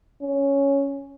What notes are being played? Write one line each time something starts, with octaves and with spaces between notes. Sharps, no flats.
C#4